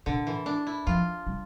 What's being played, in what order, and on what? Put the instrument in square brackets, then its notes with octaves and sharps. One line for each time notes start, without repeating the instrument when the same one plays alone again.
[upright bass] A#2 [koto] D3
[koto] E3
D4
E4
[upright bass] F3 [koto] F4
[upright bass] G3